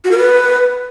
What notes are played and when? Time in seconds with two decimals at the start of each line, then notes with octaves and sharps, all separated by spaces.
0.04 F#4
0.11 A#4
0.18 B4